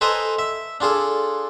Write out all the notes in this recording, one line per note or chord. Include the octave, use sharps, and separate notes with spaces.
A4 B4 C5 D#5 G#5 A#5
E5
D4 F4 G#4 A4